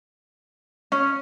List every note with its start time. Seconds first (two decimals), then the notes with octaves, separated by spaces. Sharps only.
0.92 C#4